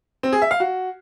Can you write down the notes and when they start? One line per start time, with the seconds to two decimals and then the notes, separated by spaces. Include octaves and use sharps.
0.23 C4
0.32 G#4
0.42 E5
0.51 F5
0.60 F#4